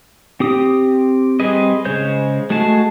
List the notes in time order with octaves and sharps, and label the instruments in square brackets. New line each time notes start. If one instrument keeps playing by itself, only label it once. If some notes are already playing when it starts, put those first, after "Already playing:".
[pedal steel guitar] C4 G4 D#6
G3 C4 G#4 B4 D#5
C#3 G#3 C5 C#5 G6
G#3 A3 F#4 G#4 A5